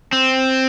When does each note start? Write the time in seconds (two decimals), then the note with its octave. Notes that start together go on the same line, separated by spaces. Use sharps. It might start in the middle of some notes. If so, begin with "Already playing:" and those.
0.13 C4